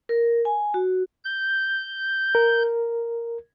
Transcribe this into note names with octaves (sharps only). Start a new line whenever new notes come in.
A#4
G#5
F#4
G6
A#4